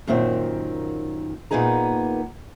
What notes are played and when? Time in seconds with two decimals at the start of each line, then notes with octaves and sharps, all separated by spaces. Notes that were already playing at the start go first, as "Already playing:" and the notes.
0.07 F#2 A#2 D#3 C4
1.51 A#2 A#3 B3 D#4 G#4 A#5